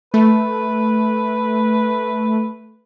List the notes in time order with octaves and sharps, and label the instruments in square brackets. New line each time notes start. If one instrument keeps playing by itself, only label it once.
[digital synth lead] A3 [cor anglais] B4